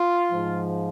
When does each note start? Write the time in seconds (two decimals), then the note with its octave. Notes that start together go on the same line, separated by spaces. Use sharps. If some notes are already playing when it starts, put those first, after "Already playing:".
Already playing: F4
0.32 G#2 F3